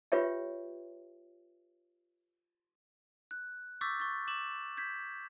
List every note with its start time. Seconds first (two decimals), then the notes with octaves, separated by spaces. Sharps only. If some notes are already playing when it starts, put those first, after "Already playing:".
0.12 F4 G4 B4 C#5 E5 G5
3.31 F#6
3.81 C#6 D6 E6 G6 A6 B6
4.00 C#6 A6
4.28 D6 E7 F#7
4.77 G6 G#6 B6